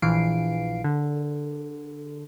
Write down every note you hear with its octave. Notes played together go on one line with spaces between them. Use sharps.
A#1 E3 F5 C7 D7
D3